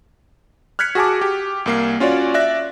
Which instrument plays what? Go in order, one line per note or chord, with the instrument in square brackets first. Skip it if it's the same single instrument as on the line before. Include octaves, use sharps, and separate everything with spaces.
[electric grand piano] F6 F#6 G#6 B6 C#7
F#4 G#4 G#5 A5 D6
G4
C2 A#3 C7
C#4 F4 F#4 C#5 D5
D5 E5 F#6 A#6